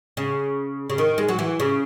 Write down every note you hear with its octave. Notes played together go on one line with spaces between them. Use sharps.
C#3
C#3
D#3
G#3
F#3
E3
C#3